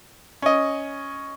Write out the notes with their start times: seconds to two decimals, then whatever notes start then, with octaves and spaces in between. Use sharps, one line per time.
0.42 C#4 D#5